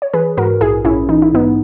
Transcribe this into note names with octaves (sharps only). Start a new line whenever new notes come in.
C#5
E3 G#4 B4
G#2 F#4 A#4
A#1 E4 G#4
A#1 C#4 E4
E3 D#4
E4
G#2 B3 D#4